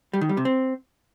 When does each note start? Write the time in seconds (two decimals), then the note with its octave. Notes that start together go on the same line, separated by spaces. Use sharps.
0.13 G3
0.21 D#3
0.29 G3
0.37 C3
0.45 C4